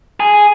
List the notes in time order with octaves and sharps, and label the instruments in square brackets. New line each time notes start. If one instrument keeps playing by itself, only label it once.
[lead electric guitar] G#4